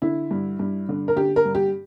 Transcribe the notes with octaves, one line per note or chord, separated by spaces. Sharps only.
D3 E4
G2
G2
D3
A#4
D3 G4
A#4
G2
G4